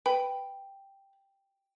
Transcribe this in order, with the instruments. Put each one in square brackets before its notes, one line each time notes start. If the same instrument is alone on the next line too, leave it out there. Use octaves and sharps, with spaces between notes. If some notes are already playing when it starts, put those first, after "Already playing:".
[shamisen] B4 [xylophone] G5